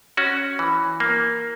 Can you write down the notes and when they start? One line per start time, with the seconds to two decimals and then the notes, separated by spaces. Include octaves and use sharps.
0.17 C#4 F#4
0.59 E3
1.00 A#3